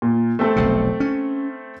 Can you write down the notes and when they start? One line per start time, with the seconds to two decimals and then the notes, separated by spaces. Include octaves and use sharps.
0.02 A#2
0.39 A3 C4 A4
0.56 F1 B1 C3
1.00 C#4